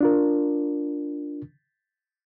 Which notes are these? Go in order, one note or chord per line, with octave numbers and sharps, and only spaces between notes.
D4 F4 A#4